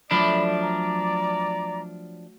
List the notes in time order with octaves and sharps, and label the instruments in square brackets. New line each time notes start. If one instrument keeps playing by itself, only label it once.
[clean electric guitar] F3 D4 [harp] F#3 A3 [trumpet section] D5 [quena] B5
[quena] A#5